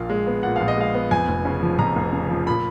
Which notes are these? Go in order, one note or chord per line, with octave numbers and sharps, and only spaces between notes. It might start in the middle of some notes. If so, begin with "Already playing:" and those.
Already playing: A#1 A#2 F5
G#3
B3
A#2 F#5
A#1 F5
D#5
G#3 F5
B3
F2 G#5
F1
C#3
F3
F2 A#5
F1
C#3
F3
A#2 B5